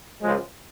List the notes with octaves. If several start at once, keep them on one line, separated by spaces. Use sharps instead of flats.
C#2 C#3 F3 G#3